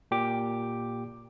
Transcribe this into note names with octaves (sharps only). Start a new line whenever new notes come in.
A#2 G4 D6